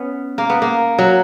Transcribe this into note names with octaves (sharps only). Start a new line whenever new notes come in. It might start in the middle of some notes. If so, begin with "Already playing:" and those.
Already playing: B3 C#4
A#3
B3
A#3
F#3